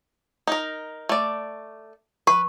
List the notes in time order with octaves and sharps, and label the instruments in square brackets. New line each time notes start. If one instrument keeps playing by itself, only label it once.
[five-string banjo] D#4 A#4
A3 D5
[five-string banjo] B4 [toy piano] C#6